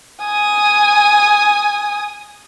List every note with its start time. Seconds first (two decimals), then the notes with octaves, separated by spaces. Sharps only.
0.23 G#5 D#6